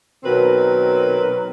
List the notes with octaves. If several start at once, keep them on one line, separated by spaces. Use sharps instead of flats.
B2 D#3 F#3 C4 A#4 B4